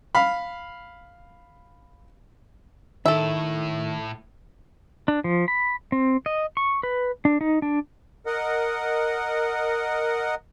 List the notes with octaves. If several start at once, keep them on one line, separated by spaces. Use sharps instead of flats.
F5 B5
A2 D#3 E4 A4 E5
D4
F3
B5
C4
D#5
C#6
B4
D4
D#4
D4
A#4 D#5 F#5